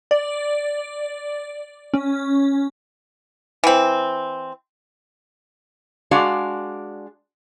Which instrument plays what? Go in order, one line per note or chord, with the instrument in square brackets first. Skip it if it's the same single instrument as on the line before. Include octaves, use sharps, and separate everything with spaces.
[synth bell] D5
C#4
[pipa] E3 C4
[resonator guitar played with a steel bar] G#3 D4 F#4 D5 F5